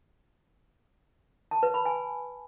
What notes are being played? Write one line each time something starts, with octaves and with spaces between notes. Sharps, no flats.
A5
B4
B5
G#5